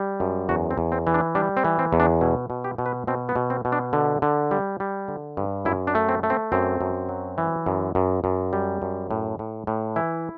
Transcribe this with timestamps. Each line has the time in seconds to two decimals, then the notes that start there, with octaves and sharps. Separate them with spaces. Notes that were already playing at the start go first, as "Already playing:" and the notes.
Already playing: G3
0.20 F#2
0.49 E2 F#4
0.71 C4
0.78 E2
0.92 C4
1.07 E3
1.14 D4
1.35 G3 D4
1.57 C4
1.64 E3
1.79 C4
1.93 E2
2.00 D4
2.21 B2 E4
2.50 B2
2.64 G4
2.78 B2
2.86 B4
3.07 B2 C4
3.29 B3
3.36 B2
3.50 C4
3.65 B2
3.72 D4
3.93 D3
4.22 D3
4.51 G3
4.80 G3
5.08 D3
5.37 G2
5.65 F#2 E4
5.87 D4
5.95 A3
6.09 C4
6.23 A3
6.30 C4
6.52 F#2 C4
6.81 F#2
7.09 F#3
7.38 E3
7.66 F#2
7.95 F#2
8.24 F#2
8.53 G3
8.82 F#2
9.11 A2
9.39 A2
9.67 A2
9.96 E3 E4